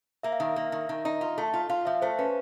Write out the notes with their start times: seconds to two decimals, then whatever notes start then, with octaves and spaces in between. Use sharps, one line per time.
0.23 A#3 E5
0.32 F5
0.40 D#3 E5
0.56 A#3
0.72 D#3
0.89 D#3
1.05 D#4
1.21 F4
1.38 A3
1.54 F4
1.69 F4 F5
1.85 F3 E5
2.02 A3 C5
2.19 C#4 B4